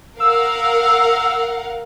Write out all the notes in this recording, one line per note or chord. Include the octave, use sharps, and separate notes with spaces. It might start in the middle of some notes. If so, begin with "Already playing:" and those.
A#4 F5 F#5 E6